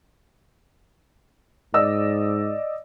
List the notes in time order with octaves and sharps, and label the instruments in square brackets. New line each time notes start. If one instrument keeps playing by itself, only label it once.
[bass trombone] G#2 [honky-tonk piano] D5 D#5 E6